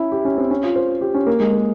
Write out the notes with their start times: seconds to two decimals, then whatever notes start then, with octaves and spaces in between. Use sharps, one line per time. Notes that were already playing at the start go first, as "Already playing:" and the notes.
Already playing: C#4 E4
0.12 G4
0.25 C#4
0.38 C4
0.51 C#4
0.63 F4
0.76 C5
1.01 G4
1.14 C#4
1.27 A#3
1.40 G#3
1.53 A#3